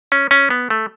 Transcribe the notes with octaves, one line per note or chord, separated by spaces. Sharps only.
C#4
C#4
B3
A3